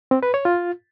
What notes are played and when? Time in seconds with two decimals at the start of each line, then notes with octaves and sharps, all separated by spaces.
0.11 C4
0.23 B4
0.34 C#5
0.45 F4